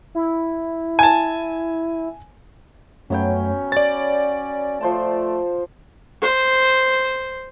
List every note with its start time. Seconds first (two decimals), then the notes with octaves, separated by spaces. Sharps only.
0.15 E4
0.99 G#5 A5
3.10 F#2 F#3 A3 B3 C#4 C#5 G5
3.72 C#5 D5 A6
4.81 F3 A3 C5 A5
6.22 C5